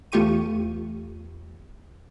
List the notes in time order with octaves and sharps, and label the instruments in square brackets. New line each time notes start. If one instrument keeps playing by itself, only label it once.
[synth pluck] E2 A3 F4 G4 C#6 D#7